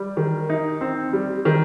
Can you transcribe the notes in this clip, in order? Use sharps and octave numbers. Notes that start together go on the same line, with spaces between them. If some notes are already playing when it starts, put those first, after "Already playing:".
Already playing: G3
D#3
D#4
C4
G3
D#3